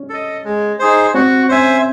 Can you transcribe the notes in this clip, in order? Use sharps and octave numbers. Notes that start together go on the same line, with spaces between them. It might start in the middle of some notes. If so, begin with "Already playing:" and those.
Already playing: C#4
A4 D#5
G#3
D#4 G#4 C5
C4 F#4
C#4 C5 E5 G#5